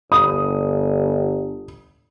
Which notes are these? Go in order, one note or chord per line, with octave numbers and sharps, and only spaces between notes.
G1 D#6